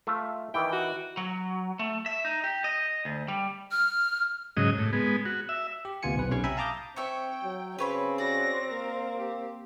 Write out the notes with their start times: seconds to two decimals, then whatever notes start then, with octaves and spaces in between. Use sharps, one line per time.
0.07 A3 F4 E5
0.54 D#3 E3 E4 G5
0.73 F#4
1.17 F#3
1.79 A3
2.06 E5
2.25 D#4
2.44 G4
2.64 D#5
3.05 D2
3.28 G3
3.71 F6
4.57 G#2 C#3 F#3 D#5
4.78 A2
4.93 G#3 B3
5.25 F#4
5.49 E5
5.85 G4
6.03 D2 C3 B3 F4 G#5 C#7
6.15 B1 B4
6.30 B1 C3 C#4 C#5 C#6
6.44 E5 G5 G#5 A#5 B5
6.57 F5 A5 A#5 D6 D#6 G6
6.96 C4 C#5 E5 G5 C#6
7.43 F#3
7.79 C#3 C4 B4 C#5 B5
8.18 F#4 D5 A#6
8.71 A#3 A#4
9.17 G4